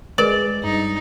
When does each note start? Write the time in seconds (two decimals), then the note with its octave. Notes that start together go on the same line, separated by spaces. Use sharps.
0.18 G#3 A#4 B4 D5
0.63 G2 D#4